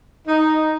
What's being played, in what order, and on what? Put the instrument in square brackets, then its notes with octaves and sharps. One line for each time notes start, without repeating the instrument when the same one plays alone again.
[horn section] D#4